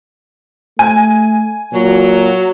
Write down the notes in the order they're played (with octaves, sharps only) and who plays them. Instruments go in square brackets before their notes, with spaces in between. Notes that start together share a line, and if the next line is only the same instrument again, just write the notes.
[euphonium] A3 [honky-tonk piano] G#5
[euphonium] A#2 [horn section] F#3